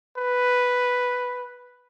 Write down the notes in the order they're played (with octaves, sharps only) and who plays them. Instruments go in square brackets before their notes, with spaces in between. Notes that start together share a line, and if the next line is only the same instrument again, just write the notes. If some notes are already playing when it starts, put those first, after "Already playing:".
[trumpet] B4